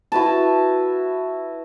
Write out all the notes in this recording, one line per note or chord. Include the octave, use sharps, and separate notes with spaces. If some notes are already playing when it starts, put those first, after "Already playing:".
E4 F#4 B4 A5